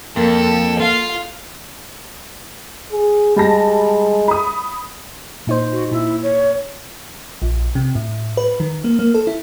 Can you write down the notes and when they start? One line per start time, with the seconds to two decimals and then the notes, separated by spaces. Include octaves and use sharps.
0.16 F2 A#3 A4
0.80 F4 F5
2.91 G#4
3.36 G3 G#3 A5 A#6
4.28 B5 D#6
5.47 A#2 D#4 C5
5.73 F#4
5.91 A#2 E4
6.23 C#5
7.42 A#1
7.75 C3
7.95 A2
8.37 B4
8.60 D#3
8.84 A#3
8.99 A#3
9.14 A4
9.27 E4